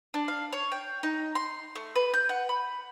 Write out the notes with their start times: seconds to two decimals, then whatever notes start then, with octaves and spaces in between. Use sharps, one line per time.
0.14 D4
0.28 F5
0.53 C#5
0.72 G5
1.03 D#4
1.35 C6
1.75 A3
1.95 B4
2.14 G6
2.29 F#5
2.49 B5